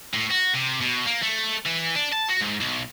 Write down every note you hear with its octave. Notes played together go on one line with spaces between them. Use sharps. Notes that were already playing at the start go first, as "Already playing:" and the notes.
A2
F#4
C3
B2
A#3
A3
E3
D4
A5
F#4
G#2
B1